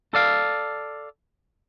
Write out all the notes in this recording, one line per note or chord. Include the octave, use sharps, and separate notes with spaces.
A4 D5 F5